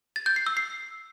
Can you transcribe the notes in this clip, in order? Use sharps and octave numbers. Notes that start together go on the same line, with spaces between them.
A6
G6
C7
E6
C7